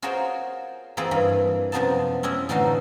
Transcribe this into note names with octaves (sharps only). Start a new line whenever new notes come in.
F4 F#4 G#4 A#4 C5 C#5
E3 A#3 C4 F4 G#4 B4
G2 E3
F#2 C3 F3 B3 D#4 A5
C4 C#4 E4 D#5
A2 D3 E3 D#4 F#4 F5